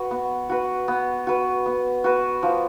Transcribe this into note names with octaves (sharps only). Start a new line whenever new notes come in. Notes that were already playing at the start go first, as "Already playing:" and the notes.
Already playing: F#4 B4
B3
F#4 B4
B3
F#4 B4
B3
F#4 B4
F3